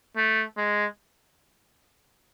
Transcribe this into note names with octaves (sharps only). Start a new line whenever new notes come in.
A3
G#3